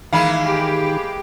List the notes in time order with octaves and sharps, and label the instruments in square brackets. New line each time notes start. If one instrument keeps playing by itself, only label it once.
[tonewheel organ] D#3 [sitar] E3 G#3 A#3 [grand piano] F5 B5
[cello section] G4